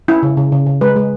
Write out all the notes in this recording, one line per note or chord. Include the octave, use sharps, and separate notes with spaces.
C#4 E4
C#3
C#3
C#3
C#3
G#3 B4
G#3